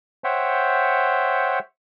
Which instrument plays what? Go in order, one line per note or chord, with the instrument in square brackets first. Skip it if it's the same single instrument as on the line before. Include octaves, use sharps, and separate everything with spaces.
[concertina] C5 C#5 E5 F#5 G5